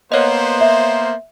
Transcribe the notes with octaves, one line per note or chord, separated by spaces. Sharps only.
A#3 B3 C5 C#5 D#5
E5